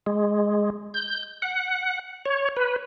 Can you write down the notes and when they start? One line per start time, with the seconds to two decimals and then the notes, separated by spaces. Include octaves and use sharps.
0.06 G#3
0.94 G6
1.42 F#5
2.26 C#5
2.57 B4